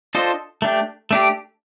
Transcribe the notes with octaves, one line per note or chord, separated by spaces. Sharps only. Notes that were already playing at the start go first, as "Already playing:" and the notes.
D4 F4 A4 C5 D#5
A3 D4 G4
A3 D4 G4